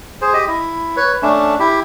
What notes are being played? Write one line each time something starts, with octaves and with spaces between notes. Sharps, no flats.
G#4 C5
G4 D#5
E4
B4 C#5
A3 C#4 D4
E4 G4